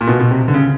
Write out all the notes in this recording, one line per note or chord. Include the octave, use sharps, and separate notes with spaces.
A#2
B2
B2
C3
D3
C#3